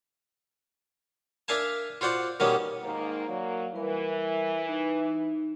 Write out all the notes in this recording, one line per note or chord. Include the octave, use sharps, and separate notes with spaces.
D4 A#4 E5 F5 G#5 A5
F4 F#4 C5 D5 F#5
B2 D#3 G3 A#3 C#4
G#2 D#3 A#3
F#3 A#3 D5 F5
E3 G3 A#4
D#4